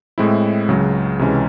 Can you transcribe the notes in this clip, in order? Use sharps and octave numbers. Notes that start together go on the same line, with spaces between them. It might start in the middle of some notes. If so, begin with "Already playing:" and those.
A2 G#3 C4 E4
C#2 C#3 F#3
C#2 C3 E3 G#3 C#4